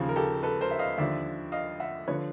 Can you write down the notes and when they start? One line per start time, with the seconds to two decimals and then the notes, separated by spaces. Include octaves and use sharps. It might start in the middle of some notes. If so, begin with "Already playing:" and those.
Already playing: D#2 C#3 F3
0.09 A#4
0.16 G4 A4
0.43 A4 B4
0.61 A#4 C5
0.71 E5
0.79 D#5 F5
0.98 D#2 D3 F3 D5 E5
1.52 D#5 F5
1.80 E5 F#5
2.08 D3 F3 B4 C#5